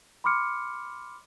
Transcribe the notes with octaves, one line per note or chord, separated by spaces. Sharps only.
B5 C6 D6 F6 C#7